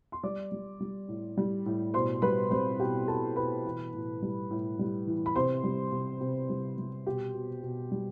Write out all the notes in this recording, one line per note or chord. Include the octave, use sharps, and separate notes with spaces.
C6
G3 D5 D6
G3
G3
A2
G3
A2
B2 C5 C6
G3 B4 B5
G3 C4 C5
B2 G4 G5
B2 A4 A5
B2 B4 B5
E3
A2
G3
A2
G3
E3
B5
C3 C5 C6
G3
C3
C3
G3
G3
B2 G4 G5
B2
B2
G3